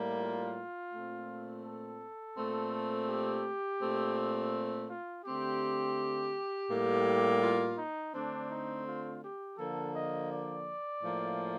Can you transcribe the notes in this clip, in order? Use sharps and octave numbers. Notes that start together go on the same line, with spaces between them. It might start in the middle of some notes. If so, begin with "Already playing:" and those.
Already playing: A2 G3 A#3
F4
A#2 A3 C4
A4
A#2 A3 C4
G4
A#2 A3 C4
F4
D3 A3 C4 G4
A2 G3 A#3
F4
D#4
D3 A3 C4 D4
D#4
F4
G4
D3 F3 A#3 A4
D#5
D5
A2 F3 A#3